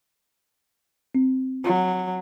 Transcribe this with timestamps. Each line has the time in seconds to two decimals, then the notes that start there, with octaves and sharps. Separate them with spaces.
1.15 C4
1.64 F#3